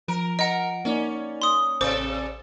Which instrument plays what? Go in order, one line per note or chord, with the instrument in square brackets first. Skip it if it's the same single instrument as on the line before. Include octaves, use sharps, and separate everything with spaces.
[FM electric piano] F3 [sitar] A#4
[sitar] A#4 [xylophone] D#5 F#5
[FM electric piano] A#3 D#4 D5 [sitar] C#4
[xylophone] C6 D#6
[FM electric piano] A1 D5 [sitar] C3 A4 [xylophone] C5 D6